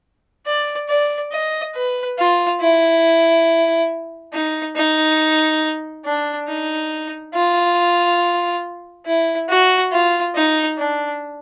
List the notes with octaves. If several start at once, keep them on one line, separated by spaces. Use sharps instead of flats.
D5
D5
D#5
B4
F4
E4
D#4
D#4
D4
D#4
F4
E4
F#4
F4
D#4
D4